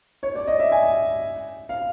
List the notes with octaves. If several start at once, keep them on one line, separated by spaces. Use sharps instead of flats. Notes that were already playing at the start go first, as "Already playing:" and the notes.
C#5
D5
D#5
E5
G#5
F5